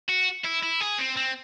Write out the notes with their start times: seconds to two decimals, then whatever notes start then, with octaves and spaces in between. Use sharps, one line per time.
0.09 F#4
0.45 E4
0.63 E4
0.81 G#4
0.99 C4
1.17 C4